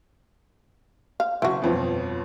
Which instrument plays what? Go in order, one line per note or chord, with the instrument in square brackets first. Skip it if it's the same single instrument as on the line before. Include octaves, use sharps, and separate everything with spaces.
[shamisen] F5
[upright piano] F#1 C#6 [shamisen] E4 F#4
[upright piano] G1 F2 B2